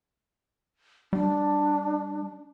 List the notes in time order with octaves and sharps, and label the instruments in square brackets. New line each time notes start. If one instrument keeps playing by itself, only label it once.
[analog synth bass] G3 [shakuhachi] D4